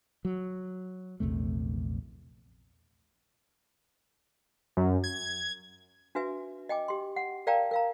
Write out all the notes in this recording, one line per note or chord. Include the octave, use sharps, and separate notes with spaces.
F#3
A#1 E2 C3 A3
F#2
G#6
D4 F#4 B4 E5 G#5
D#5 G5 G#5 D6
G4 C6
F#5
A#4 D5 F5 G5 A5 A#5
A#4 F5 A#5